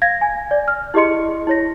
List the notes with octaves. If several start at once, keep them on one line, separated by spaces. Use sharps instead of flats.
F5 G#6 A#6
G#5
D5
F6
E4 G4 G#4 D#5 C6 C#7
E4 C#5 A#6